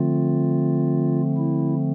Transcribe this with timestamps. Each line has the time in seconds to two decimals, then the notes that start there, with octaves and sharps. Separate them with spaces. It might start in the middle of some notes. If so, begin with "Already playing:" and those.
Already playing: D3 F3 A3 C4 F4
1.37 E4